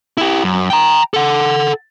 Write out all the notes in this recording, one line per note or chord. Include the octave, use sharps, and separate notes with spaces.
E4 G4
F#2
G5 A#5
A4 F#5